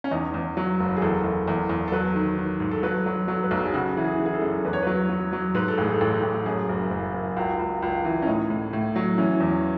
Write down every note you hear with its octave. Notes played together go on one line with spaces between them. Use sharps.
C#4
E2 D#4
E2
F#3
F#1
G#4
E2 A4
E2
E2
E2
A4
F#3 B4
D#3
D#3
G#2
A4
F#3 B4
F#3
F#3 A4
B4
B1 A4
G#4
C#3 F#4
E3
G#4
E3
G#4
A4
F#2
E2 B4
C#5
F#3 B4
F#3
F#3
G#2 B4
A4
A1 G#4
A4
A1
A1
F#2 G#4
F#1
F#1
F#1
C#2 F#4
C#2
C#2
E3
C#4
A2 D#4
A2
A2
F#3
E3 C#4
E2